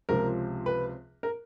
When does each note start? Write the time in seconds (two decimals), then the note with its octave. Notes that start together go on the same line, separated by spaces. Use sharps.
0.09 C#2 C3 F3 A#4
0.66 B4
1.23 A#4